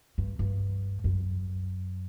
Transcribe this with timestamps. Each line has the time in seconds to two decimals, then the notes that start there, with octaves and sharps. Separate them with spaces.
0.18 G2
0.39 G2
1.04 F#2